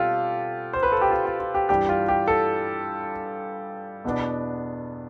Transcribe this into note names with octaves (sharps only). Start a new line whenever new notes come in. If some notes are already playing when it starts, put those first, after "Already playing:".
Already playing: B2 G3 C4 F4 G4 A4
C5
B4
A4
G4
F4
F4
F4
G4
G2 E3 G3 D4 G4
F4
G4
A4
E2 B2 B3 D4